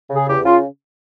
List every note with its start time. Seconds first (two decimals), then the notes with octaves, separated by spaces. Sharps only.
0.10 C#3 G#4
0.27 E2 G4
0.44 C#3 F4